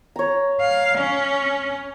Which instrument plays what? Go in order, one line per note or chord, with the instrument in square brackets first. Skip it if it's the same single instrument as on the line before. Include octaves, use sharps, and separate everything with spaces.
[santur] C#5 A#5
[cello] F5
C#4